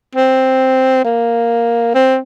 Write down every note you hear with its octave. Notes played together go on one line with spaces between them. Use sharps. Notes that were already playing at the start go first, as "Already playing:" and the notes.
C4
A#3
C4